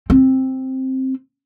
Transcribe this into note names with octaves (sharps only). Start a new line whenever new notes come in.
C4